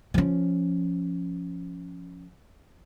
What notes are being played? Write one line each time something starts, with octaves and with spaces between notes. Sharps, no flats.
F3 C#4